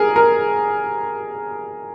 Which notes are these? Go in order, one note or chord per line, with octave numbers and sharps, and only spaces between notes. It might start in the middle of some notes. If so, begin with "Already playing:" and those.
Already playing: G#4 A#4
A#4